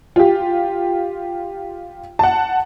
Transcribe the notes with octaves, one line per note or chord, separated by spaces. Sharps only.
F4 G4
F#5 A5